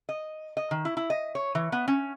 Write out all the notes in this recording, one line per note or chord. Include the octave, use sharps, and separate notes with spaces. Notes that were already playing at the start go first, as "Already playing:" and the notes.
D#5
D#5
D#3
E4
E4
D#5
C#5
E3
B3
C#4